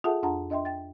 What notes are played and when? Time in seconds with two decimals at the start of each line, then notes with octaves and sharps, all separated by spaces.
0.04 F4 G#4 A4 E5 F#5 A5
0.23 F2 D4 F4 F#5 A5 A#5
0.50 D4 D#5 E5 G5 C6
0.65 G5 A6